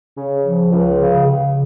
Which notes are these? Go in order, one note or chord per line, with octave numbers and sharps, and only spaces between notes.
C#3
F3
C#2
C#3
C#3